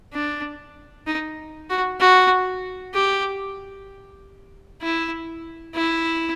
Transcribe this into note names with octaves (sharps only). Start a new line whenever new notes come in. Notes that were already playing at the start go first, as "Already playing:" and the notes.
D4
D#4
F#4
F#4
G4
E4
E4